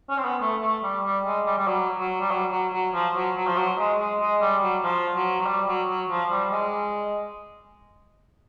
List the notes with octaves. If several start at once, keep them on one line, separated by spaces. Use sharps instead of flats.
C#4
C4
B3
A3
A3
G3
G3
G#3
G3
G3
F#3
F#3
G3
F#3
F#3
F#3
F3
F#3
F#3
F3
F#3
G#3
G#3
G#3
G3
F#3
F3
F#3
F#3
G3
F#3
F#3
F3
G3
G#3